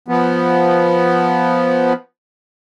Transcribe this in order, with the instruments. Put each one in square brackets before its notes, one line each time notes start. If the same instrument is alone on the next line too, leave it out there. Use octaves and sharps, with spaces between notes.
[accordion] F3 B3